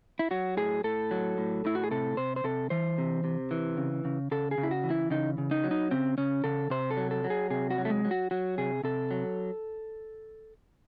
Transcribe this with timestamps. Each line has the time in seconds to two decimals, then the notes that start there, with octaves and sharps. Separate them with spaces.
0.19 E4
0.31 F#3 F#4
0.57 A2 G#4
0.84 A2 A4
1.11 F#3
1.38 A2
1.65 A2 E4
1.75 F#4
1.84 G#4
1.91 C3 A4
2.17 C3 C5
2.36 C5
2.44 C3 A4
2.70 E3 C5
2.98 C3
3.24 C3
3.51 E3
3.77 C#3
4.05 C#3
4.31 C#3 A4
4.51 G#4
4.58 C#3
4.63 E4
4.71 F#4
4.84 E3
4.90 E4
5.10 C#3 D#4
5.38 C#3
5.51 D#4
5.64 F#3
5.71 D#4
5.91 C#3 C4
6.18 C#3 C#4
6.44 C#3 A4
6.70 C3 C5
6.91 A4
6.97 F#3
7.11 A4
7.24 F#3
7.30 G#4
7.50 C3 G#4
7.70 F#4
7.78 F#3
7.85 A3
7.90 G#3
8.05 F#3
8.11 F#4
8.31 F#3 F#4
8.58 C3 G#4
8.84 C3 A4
9.11 F#3